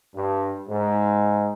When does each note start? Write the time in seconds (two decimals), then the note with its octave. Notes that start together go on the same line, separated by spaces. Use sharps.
0.15 G2
0.69 G#2